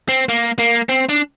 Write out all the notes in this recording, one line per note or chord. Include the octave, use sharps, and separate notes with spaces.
C4
A#3
A#3
C4
D4